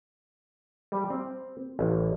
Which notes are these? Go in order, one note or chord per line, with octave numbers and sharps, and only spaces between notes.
G3
C4
A1